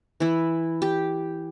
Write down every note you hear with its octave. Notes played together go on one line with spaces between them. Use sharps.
E3 E4
G4